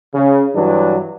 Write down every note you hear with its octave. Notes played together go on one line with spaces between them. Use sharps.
C#3
G2 E3 F#3 D4